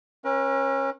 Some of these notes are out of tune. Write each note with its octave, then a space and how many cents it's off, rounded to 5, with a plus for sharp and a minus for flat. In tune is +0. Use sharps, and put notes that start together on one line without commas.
C#4 -30 A#4 +45